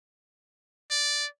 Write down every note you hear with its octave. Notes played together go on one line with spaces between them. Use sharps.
D5